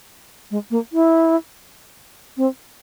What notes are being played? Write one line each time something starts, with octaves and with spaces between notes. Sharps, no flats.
G#3
A#3
E4
C4